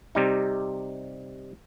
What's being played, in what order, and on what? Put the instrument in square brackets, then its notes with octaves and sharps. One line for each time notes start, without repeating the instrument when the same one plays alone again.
[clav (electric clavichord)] C3 G3 D#4